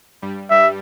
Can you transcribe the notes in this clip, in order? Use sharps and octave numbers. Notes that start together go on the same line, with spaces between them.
G2 G3
G2 G3 E5